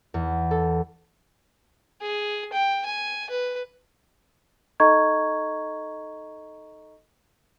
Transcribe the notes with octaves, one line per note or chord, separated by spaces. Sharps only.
E2
A4
G#4
G5
G#5
B4
D#4 A4 D#5 A#5 C#6 G#6